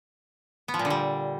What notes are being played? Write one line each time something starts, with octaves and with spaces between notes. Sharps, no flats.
B3
F3
A#2
D3
G3